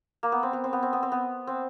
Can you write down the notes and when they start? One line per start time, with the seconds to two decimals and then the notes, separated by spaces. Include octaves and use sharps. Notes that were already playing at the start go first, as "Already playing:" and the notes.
0.23 A#3
0.32 B3
0.43 C4
0.53 B3
0.64 C4
0.73 B3
0.83 C4
0.93 B3
1.03 C4
1.12 B3
1.47 C4